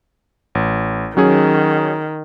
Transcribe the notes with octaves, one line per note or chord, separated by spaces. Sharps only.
A1
D#3 F#3 C#4 G#4